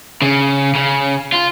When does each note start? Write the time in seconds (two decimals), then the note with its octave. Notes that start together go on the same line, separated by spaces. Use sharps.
0.22 C#3
0.75 C#3
1.33 F4